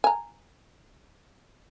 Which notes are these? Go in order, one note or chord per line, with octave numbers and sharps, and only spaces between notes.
G#5 A#5